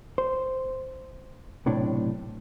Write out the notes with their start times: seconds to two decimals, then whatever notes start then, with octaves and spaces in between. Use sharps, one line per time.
0.18 C5
1.66 B1 A2 C3 D4